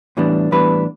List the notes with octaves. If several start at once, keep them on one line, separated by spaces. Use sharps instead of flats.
A2 E3 G3 B3 D4
A2 E3 G3 B3 D4 B4